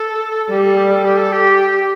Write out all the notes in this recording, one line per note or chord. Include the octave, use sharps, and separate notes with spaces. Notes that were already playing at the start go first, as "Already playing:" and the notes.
Already playing: A4
G3 G4
A4
G4
A4
G4
A4
G4